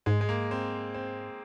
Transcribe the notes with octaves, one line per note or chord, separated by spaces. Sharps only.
G#2 G#3
G#3
A#3
C4
C4